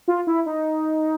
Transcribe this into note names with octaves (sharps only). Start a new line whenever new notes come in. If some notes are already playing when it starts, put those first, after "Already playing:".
F4
E4
D#4